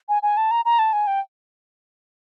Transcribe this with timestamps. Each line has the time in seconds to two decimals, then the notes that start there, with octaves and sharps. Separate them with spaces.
0.09 G#5
0.23 G#5
0.37 A5
0.51 A#5
0.65 A#5
0.79 A5
0.93 G#5
1.07 G5